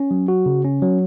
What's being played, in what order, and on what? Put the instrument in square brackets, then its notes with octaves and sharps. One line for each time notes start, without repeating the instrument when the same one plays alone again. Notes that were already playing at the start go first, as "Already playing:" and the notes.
Already playing: [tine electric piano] C#4
F#3
F#4
C#3
C#4
F#3